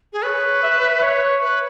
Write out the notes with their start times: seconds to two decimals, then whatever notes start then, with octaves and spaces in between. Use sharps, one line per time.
0.13 G#4
0.23 B4 C#5
0.63 E5
1.02 C#5
1.42 B4